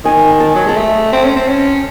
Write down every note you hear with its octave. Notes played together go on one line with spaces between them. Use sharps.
D#3 G#5
A5
F#3
G#3 A5
A3
C4
C#4
C4
C#4